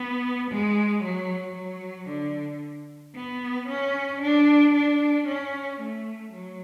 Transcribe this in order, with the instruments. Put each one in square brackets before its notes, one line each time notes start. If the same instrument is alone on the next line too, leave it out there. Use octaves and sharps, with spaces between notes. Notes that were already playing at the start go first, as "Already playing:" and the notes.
Already playing: [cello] B3
G#3
F#3
F#3
D3
B3
C#4
D4
D4
C#4
A3
F#3